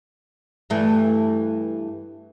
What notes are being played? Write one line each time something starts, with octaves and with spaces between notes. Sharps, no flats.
G2 E3 A3